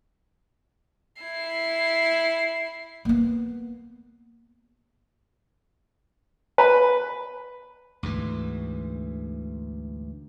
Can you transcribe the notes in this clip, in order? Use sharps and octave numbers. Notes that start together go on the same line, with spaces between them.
E4 C7
A#3 B3
B4
D2 G#2 E3